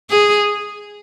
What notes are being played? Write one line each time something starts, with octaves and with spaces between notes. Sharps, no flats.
G#4